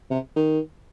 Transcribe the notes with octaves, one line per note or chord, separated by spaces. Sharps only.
C3
D#3